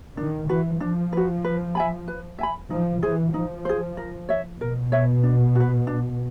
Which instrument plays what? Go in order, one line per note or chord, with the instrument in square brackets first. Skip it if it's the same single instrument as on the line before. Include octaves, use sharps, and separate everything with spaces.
[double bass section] D#3 [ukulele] D4
[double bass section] E3 [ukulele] F#4 B4
[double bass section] F3 [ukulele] D4
[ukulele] F#4 B4
B4
E5 G#5 B5
B4
E5 G#5 B5
[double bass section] F3 [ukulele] D#4
[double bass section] E3 [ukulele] G#4 C5
[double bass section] F3 [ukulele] D#4
[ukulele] G#4 C5
A#4
C#5 E5
[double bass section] B2 [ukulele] A#4
[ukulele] C#5 E5
D4
F#4 B4
D4